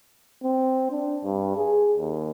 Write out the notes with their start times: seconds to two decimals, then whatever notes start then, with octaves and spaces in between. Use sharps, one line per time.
0.44 C4
0.91 D4
1.24 G2
1.57 G#4
1.98 D#2